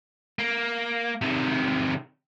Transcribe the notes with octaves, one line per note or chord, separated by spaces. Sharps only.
A#3
C3 D#3